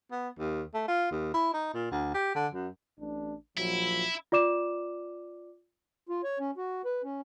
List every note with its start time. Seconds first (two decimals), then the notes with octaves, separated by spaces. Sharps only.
0.12 B3
0.39 D#2
0.74 A3
0.88 F4
1.11 D#2
1.34 E4
1.54 D#4
1.74 A#2
1.92 D2
2.14 G4
2.35 D3
2.54 F#2
2.99 A1 D4
3.57 A#1 F3 F#3 E4
4.32 F4 D5 D6 E7
6.09 F4
6.23 C#5
6.40 C#4
6.57 F#4
6.85 B4
7.04 C#4